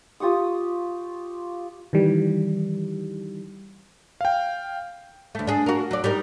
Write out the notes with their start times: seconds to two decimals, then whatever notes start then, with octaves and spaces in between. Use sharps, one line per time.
0.20 F4 G4 C#6 D#6
1.93 D#3 E3 G3
4.21 F5 G5
5.35 D2 A3
5.47 D4 G#4
5.66 F#4 A#4
5.91 F#3 D5
6.04 G3 D#4 A#4